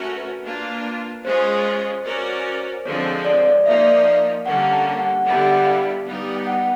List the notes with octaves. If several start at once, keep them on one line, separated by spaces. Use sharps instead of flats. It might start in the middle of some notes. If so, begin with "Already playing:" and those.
Already playing: A3 C#4 F#4 A#4
B4
A#3 D4 F4
G#3 C#4 F4 G#4 C5
C#4 F#4 A#4 D5
D3 F3 G#3 C4 C#5
C#5
D5
D5
F3 A#3 D#4 E5
D#5
D5
D#5
F5
F5
D3 G3 A#3 C#4 F#5
A#5
A5
F#5
D3 G3 B3 E4 F#5
F5
G3 B3 D#4
G5
F#5